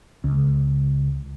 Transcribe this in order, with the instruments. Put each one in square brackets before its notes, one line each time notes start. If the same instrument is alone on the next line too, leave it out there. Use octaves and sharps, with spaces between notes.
[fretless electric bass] C#2